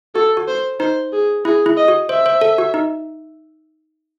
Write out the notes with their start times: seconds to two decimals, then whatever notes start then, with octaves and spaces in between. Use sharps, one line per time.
0.15 F#4 A4
0.37 F#4
0.48 C5
0.80 D#4 C5
1.13 G#4
1.45 E4 G#4
1.66 E4
1.77 D#5
1.88 F#4
2.09 C5 E5
2.26 C5
2.41 A4
2.58 F#4
2.74 D#4